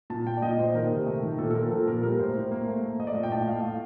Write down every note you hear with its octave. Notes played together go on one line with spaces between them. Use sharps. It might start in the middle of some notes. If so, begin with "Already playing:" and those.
A#2 A5
A#2 G5
D5
A#2 D#5
A#2 C5
D#3 A#4
C3
A3
D#3
A#2 A4
A4
F3 A#4
F3 A4
A#2 A#4
G3 A#4
A2 C5
A2
A#3
A3
A3
A3 D#5
D5
A#2 D#5
G5
A2 A5
A3 F5
A3